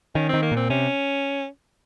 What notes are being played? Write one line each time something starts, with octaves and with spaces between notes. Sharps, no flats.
D#3 C#4
C4
D#3
A#3
A#2 C4
C3 C#4